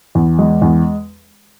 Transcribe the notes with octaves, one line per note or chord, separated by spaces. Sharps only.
E2
G#3
E2